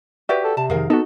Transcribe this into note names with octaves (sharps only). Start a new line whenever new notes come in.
F#4 G4 B4 D5 E5 F#5
A4
C3 A5
F2 D#3 G#4 A#4 F5
B3 D#4 F#4 A4